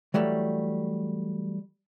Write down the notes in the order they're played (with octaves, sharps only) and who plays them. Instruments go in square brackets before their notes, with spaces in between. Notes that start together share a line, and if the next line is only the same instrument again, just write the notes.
[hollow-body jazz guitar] E3 F#3 G3 A3